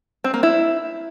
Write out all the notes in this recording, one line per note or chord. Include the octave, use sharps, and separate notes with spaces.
C4
A#3
E4